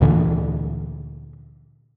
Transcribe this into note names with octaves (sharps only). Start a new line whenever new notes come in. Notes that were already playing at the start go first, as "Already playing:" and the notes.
D2 A#2 D3 E3